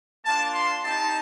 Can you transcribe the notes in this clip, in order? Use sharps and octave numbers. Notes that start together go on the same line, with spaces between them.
A#3 D4 F4 A5
C6
C4 D#4 G4 A5